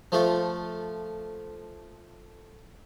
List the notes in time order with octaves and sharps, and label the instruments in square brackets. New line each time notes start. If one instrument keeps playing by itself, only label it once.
[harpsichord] F3 A3 F4